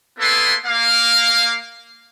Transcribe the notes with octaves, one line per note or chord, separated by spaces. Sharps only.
A#3 B3 E4 A4 B4 C6
A#3 F5